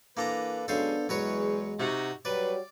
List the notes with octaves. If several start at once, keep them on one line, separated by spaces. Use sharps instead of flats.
E3 A#3 D4 A4 B4 A#5
C#3 F#3 G#3 B3 D4 A4 C5 F5
E2 F#3 G#3 B4 C#5
C3 D#4 F#4
F#3 G3 F#4 B4 C#5 D5